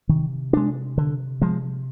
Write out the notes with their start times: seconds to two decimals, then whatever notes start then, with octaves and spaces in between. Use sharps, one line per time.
0.09 C3 D#3
0.53 G#3 D4
0.98 D3
1.41 F3 G#3